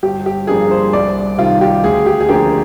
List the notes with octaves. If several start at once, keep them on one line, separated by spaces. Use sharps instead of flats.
G1 G4
G4
G2 F3 A#3 D4 G#4
C5
C2 D5
C3 D#3 G3 F4
G4
D2 G#4
G4
G#4
D3 F3 A#3 D4 G4